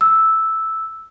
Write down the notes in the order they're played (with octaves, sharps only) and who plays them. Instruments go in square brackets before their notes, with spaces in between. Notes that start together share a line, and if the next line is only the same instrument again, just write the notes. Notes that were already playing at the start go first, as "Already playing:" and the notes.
[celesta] E6